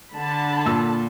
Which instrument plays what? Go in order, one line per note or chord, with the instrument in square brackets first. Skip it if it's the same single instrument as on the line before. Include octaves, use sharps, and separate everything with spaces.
[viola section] D3 A5 B5
[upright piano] A#2 E6